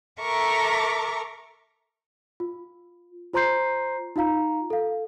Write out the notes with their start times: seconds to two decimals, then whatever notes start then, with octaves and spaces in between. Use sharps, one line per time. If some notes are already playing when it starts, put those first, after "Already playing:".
0.20 A4 A#4 E5 A#5 C#6 D6
2.40 F4
3.33 F4 C5 A#5 C6 G6 C7
4.16 D#4 F4 F5 A#5
4.70 A4 F5